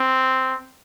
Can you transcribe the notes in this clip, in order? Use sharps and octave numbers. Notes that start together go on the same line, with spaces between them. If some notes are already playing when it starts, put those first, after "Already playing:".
Already playing: C4